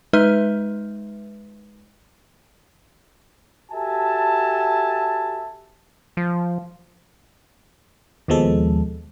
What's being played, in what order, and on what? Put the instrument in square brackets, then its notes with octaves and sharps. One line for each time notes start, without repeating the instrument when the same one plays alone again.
[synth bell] G#3 D#4 B4 E5 F6
[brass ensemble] F#4 G4 A4 E5 G#5 A5
[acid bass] F3
[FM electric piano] D#2 B2 F3 G#3 A4